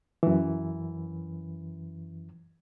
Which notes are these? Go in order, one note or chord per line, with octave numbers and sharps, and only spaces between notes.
F#2 E3